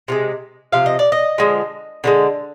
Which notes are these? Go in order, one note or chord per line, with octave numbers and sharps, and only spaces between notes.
C3 F3 G#3
C3 F3 F5
D#5
D5
D#5
D3 F3 G#3
D3 F3 G#3